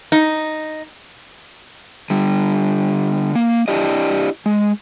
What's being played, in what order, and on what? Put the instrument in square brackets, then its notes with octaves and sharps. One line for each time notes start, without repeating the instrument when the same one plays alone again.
[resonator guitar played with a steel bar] D#4
[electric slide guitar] D3 G3
A#3
D4 E4 G4 D#5
G#3